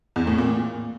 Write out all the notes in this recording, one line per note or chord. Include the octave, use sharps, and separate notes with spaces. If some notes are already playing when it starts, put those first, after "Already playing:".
E2
A2
A#2